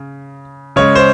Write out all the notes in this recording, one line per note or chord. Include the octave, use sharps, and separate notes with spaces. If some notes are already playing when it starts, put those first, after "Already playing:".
Already playing: C#3
C#3 G#3 C#5
C5